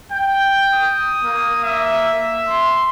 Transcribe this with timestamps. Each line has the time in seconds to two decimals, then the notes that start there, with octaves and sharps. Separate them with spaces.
0.11 G5
0.75 D#6
1.23 A#3
1.64 E5
2.49 C6